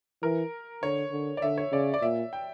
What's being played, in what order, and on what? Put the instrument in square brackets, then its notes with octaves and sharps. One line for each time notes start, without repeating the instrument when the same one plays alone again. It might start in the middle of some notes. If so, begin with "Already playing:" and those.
[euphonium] E3 [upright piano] A#4
[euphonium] D3 [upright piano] C#5
[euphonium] D3
[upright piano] D5
[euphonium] D3 [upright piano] E5
[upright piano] C#5
[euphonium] C#3 [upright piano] D5
[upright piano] D5
[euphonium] A#2 [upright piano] E5
[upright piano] G5